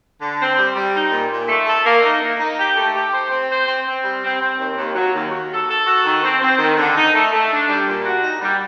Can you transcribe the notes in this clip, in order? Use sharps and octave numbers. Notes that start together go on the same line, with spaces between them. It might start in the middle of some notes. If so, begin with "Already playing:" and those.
D3
C4
G3
G3
D#4
A#2
A#2
A3
A4
A#3
D#4
A#3
D#4
G4
A3
G4
C5
C4
C5
C4
C4
G3
C4
C4
D#2
D#2
F#3
D#2
F#4
A4
A4
F#4
D#3
C4
C4
D#3
D3
D#4
A3
A3
D4
G3
A#2
F#4
D#4
G3